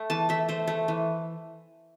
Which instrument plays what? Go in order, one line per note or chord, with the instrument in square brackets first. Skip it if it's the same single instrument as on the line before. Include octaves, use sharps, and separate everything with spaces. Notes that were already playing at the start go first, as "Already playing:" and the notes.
Already playing: [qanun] A3
E3 A5
A3 E5
A3 C5
A3
E3